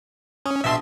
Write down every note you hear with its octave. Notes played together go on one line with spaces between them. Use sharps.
C#4 D#6
A#1 B2 E5 A5 C6